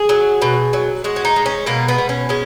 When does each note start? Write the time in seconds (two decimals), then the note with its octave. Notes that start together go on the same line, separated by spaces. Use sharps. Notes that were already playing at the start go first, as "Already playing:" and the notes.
Already playing: G#4
0.09 F#3
0.42 B2
0.73 F#3
1.04 G#3 F#4
1.16 C#4
1.25 D#4
1.36 G#3
1.46 C#4
1.66 B2 A#3
1.88 B3
1.98 B2
2.09 C#4
2.29 G#3 C#4